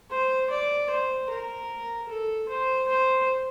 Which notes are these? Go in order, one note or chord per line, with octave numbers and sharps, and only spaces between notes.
C5
D5
C5
A#4
A4
C5
C5